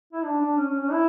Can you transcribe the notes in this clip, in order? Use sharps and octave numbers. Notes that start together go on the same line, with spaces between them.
E4
D4
D4
C#4
C#4
C#4
E4